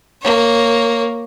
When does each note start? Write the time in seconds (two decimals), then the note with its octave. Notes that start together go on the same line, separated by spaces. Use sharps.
0.22 A#3 C#5